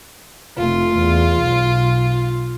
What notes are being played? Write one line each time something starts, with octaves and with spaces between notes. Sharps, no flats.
F1 A3 F4
E2
B1